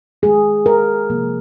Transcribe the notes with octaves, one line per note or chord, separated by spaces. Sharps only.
D#3 G#3 G#4
A#4
C3 F3 A#3